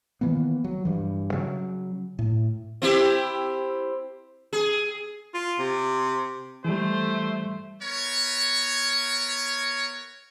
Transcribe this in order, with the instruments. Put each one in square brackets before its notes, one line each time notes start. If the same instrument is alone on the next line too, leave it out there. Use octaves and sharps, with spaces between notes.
[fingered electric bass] D#3 E3 A#3 B3
F#3
G2 E3
C#3 F#3
A2
[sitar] C4 E4 G4
G#4
[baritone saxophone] F4
C3
[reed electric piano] E3 G3 [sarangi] A3 [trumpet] C5
[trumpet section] B3 A#4 C#5